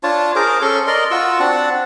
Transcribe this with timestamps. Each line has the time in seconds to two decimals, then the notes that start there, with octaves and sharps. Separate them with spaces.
0.03 D4 F4 C#5 A5
0.36 G#4 A#4 C5 D6
0.62 C#4 A4 C6 C#6
0.87 A#4 D5 D#5 C6
1.11 F4 F#4 C#6 E6
1.40 C4 D4 F#5 A5